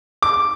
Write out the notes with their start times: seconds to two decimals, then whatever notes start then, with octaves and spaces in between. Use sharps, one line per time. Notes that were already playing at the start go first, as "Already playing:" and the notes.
0.22 D6